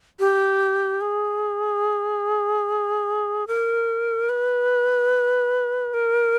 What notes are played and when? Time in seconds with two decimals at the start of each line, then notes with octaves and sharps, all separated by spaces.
0.19 G4
1.01 G#4
3.47 A#4
4.29 B4
5.94 A#4